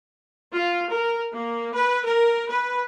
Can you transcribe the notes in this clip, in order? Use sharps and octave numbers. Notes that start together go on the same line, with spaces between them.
F4
A#4
A#3
B4
A#4
B4